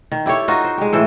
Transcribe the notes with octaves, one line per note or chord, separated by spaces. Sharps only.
D#3
E4 G4 A4 C#5
D#4 F4 F#4
C5
G#3 G4
A2 E3 A4 C5